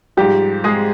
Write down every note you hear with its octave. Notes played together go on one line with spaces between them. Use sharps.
G#2 F3 G3 G4
G#3 G#4